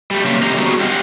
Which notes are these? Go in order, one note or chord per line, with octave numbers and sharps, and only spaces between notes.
G3 A3
C#3 A#3 E5
E2 D3 G#3 G4 C5 A#5
G3 A3 B3 F#4 G#4
F4 G4 D#5 E5 F#5